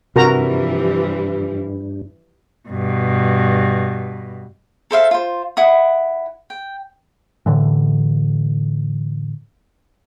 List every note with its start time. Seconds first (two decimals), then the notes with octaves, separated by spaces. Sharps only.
0.16 G2 C3 E3 F3 G3 F#4 A#4 A#5
2.69 G2 B2
4.91 A4 C5 E5 F5
5.11 F4 C5
5.57 E4 F#5 D#6
6.50 G5
7.46 A2 D3 E3